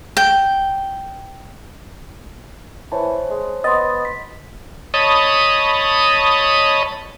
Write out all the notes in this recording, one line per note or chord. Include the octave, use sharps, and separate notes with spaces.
G5
E3 C5 C#5 A5
G#3
B3 D#5 C6 A6
B6
C#5 D#5 A5 B5 D#6